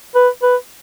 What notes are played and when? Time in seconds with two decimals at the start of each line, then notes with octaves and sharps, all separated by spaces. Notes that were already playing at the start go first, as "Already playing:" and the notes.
0.15 B4
0.42 B4